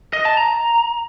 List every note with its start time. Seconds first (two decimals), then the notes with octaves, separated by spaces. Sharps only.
0.13 D#5
0.25 A5
0.37 A#5